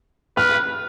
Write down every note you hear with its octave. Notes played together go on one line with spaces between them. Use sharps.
B4 F6